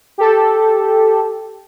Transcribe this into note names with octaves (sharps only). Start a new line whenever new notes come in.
G4 A4